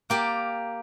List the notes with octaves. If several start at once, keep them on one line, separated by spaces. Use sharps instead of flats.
A#3 G4 D5